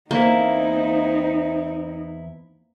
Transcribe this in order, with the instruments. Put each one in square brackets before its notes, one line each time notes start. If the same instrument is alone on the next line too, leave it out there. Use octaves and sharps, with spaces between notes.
[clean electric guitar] E2 E4 [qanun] A#3 [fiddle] C4 [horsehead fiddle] D#4